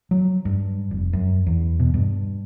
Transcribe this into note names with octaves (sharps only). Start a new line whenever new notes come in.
F#3
G2
F1
F#2
E2
B2
G2